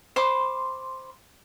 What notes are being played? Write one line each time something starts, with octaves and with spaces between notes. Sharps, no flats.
C5 B5 C6 D6